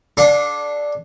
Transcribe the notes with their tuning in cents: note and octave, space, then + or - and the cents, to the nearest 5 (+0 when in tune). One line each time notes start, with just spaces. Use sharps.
D4 +0 G#4 +40 F5 +45